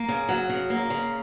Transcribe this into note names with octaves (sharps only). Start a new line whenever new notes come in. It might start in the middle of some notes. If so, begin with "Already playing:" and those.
Already playing: A#3
C#3
F#3
C#3
A#3
C#3